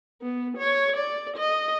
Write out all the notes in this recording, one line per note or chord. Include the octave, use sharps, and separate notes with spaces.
B3
C#5
D5
D#5